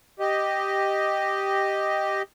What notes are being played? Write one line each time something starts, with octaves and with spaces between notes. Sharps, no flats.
G4 D#5